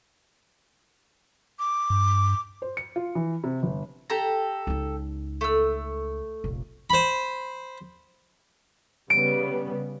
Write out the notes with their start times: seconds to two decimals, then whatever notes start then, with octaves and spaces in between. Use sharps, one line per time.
1.59 D6
1.90 G2
2.62 C5
2.77 C#7
2.96 F4
3.15 E3
3.44 C3
3.63 G1
4.10 G4 A4 A#5
4.67 C#2 D#4
5.41 A3 E6
6.44 F1 A#1
6.90 C5 B5
9.10 C#3 G3 B3 D7